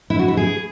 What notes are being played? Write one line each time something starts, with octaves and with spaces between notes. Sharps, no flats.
E4
F#4
E4
G#4